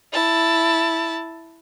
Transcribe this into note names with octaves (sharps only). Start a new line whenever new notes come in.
E4 A5